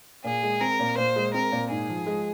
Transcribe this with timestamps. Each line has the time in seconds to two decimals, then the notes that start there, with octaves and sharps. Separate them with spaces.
0.24 A#2 G#4
0.43 G#3
0.61 C4 A#4
0.79 A#2
0.97 A#2 C5
1.16 G#3
1.34 C4 A#4
1.52 A#2
1.70 G#2 G#4
1.89 F3
2.06 G#3